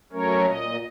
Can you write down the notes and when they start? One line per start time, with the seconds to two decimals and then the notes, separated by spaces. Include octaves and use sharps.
0.13 F#3 A3 C#4 A#4 C#5
0.46 A#2 D#5